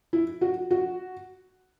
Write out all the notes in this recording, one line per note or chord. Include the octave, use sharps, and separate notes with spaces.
E4
F#4
F#4